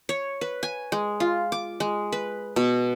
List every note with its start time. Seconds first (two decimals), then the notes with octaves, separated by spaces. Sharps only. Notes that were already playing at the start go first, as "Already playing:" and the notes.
0.09 C#5
0.41 B4
0.63 G#5
0.92 G#3
1.20 F4
1.52 D6
1.80 G#3
2.12 B4
2.56 B2